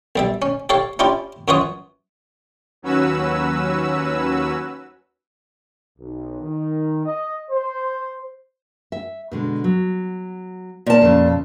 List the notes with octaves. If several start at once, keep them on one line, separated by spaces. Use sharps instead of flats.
B1 G3 E5
C#4
G4 A4 C#5 F5
C#4 D4 E4 F4 G4
F#2 E3 F4 F#4 C#5 D#6
D#2 F#3 C#4 F#4 B4 E6
B1
D#3
D#5
C5
E5
B2 D3 G#3
F#3
A#2 A#4 E5 A5
F2 C#3